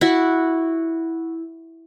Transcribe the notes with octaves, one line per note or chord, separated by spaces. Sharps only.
E4 F#4